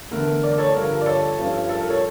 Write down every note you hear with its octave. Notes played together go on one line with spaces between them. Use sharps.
E2 D3 A3 A#4
A#4
A#4 D5
A4 C#5
G2 D3 F3 A#4
A#4
D5
A4 C#5
G2 F3 C#4
A4
A#4
A4 C#5